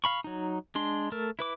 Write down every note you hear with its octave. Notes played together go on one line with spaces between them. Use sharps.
F5 B5 C#6
F#3 D#4
G#3 D4 C6
A3 A4 A#4
E4 B4 D6